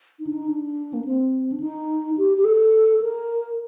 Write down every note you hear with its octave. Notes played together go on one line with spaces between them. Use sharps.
D#4
D4
D#4
D4
A#3
C4
D4
D#4
G4
G4
A4
A#4